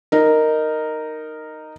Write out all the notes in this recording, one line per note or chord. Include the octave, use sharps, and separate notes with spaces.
D#4 A#4